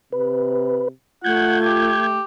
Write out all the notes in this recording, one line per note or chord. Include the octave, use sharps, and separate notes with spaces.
C3 B4
A3 F4 F#5 G6 G#6
G4